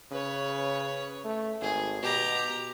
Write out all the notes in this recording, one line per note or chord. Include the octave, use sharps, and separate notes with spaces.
C#3 B4 C#5
A3
G#1 G#4
B2 G4 A#5